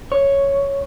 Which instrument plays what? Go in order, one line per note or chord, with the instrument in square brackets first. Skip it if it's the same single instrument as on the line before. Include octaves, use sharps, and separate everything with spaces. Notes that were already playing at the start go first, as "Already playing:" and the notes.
[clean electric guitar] C#5